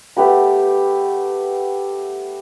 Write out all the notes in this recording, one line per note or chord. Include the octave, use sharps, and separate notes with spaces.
A3 B3 G4 B5